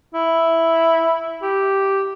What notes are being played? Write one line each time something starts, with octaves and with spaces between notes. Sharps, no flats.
E4
G4